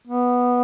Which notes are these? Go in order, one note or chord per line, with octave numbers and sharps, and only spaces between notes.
B3